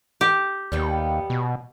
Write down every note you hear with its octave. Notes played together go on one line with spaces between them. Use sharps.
G4
D#2 G3 B3 G5
B2